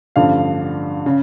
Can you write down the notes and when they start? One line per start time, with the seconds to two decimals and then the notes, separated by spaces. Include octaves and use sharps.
0.16 A1 G2 D3 F3 F5
1.06 C#3